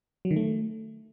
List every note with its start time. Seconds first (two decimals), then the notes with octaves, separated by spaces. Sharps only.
0.25 F#3
0.31 D#3
0.36 A3